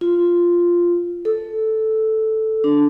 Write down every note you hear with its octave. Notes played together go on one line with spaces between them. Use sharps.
F4
A4
D4